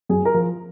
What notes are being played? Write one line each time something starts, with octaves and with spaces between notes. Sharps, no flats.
F#2 G#4 G#5
A#4 A#5
F3